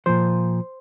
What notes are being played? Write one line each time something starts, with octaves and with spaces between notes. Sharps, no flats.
A#2 F3 C5